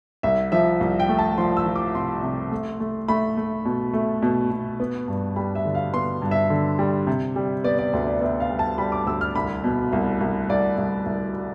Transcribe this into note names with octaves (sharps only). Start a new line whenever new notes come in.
C2 E5
F3 E5
C2
G5
A3
A5
F3 C6
E6
F3
D6
C3 C6
C3
A3
A3
A3 B5
A3
B2
A3
B2
B2
B3
G2
G3 B5
E5
D3
F5
B3 C6
G2
E5
D3
G3
C3
G3
B3 D5
D5
D2
D5
B3 E5
F5
G3
A5
G3 B5
D6
D2 E6
F6
C2 B5
B2
C2
C2
C2 D5
C2
C2